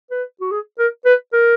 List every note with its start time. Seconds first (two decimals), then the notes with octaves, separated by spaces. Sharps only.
0.11 B4
0.41 F#4
0.51 G#4
0.79 A#4
1.05 B4
1.33 A#4